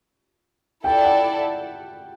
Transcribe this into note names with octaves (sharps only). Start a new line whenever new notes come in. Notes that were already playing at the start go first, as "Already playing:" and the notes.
E4 A4 D5 G5
F#5